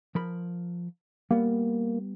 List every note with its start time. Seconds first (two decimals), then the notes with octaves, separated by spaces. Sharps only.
0.15 F3 A#4 B5
1.31 G3 A#3 B3